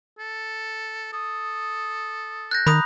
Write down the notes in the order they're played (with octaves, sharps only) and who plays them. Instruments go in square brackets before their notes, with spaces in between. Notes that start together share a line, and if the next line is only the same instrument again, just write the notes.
[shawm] A4
[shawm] A4 [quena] D#6
[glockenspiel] F#6 G6 A#6
[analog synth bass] D#3 [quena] A#5 [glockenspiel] B5 D#6